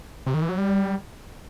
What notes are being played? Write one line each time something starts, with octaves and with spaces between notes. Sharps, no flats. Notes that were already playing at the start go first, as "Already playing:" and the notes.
C3
D#3
E3
F#3
G3